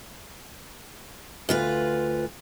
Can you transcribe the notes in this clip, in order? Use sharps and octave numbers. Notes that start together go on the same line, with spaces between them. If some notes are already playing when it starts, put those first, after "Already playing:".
D2 F4 B4